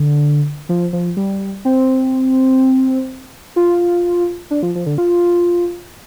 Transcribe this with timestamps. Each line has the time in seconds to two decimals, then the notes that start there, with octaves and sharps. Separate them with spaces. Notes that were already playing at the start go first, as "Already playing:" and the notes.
Already playing: D3
0.69 F3
0.93 F3
1.17 G3
1.65 C4
3.56 F4
4.51 D4
4.63 F3
4.75 F3
4.86 D3
4.98 F4